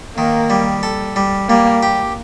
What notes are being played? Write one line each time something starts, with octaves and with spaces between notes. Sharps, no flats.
D#3 A#3
G3
A4
G3
G3 A#3
G4